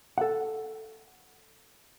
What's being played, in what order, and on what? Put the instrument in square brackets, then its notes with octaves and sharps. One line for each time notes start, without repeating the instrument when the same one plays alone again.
[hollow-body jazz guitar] A4 F#5